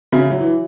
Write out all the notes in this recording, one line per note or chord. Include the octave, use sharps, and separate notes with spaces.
C#3 F#4 C#5 E5
F#3
E3